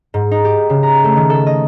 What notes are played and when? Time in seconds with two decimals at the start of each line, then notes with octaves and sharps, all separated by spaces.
0.14 G#2
0.31 D#4
0.45 G4
0.70 C#3
0.83 A#5
1.04 A3
1.16 D#3
1.30 A4
1.46 D#5